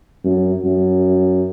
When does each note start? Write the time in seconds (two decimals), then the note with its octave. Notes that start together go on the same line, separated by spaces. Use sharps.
0.24 F#2
0.64 F#2